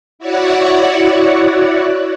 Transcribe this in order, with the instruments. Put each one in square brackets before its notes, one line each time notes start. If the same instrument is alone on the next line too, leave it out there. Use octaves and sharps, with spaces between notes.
[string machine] E4 F#4 C#5 D5 F#5